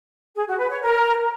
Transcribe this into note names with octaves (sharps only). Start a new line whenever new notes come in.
G#4
F#4
B4
C#5
A#4